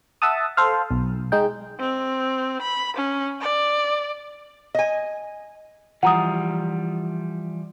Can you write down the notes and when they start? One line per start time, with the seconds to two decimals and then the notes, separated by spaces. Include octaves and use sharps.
0.22 E5 F#5 A5 D#6
0.57 A4 C5 F5
0.91 B1
1.32 G#3 D#4 G5
1.79 C4
2.62 B5
2.97 C#4
3.40 D5
4.75 D#5 G#5
6.03 E3 F3 G3 F#5 A#5 D#6